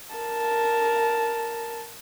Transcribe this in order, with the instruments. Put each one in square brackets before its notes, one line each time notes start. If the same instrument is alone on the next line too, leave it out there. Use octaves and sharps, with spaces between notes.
[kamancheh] A#4 A5